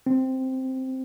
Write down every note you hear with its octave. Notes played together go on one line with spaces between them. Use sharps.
C4